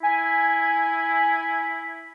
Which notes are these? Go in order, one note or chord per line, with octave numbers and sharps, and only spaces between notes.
E4 G#5